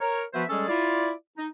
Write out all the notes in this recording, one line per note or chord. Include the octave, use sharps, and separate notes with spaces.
A#4 C#5
F3 B3 F#4 B4 C5 E5
G3 G#3 C#4 G#4 A4
E4 F4 D5
D#4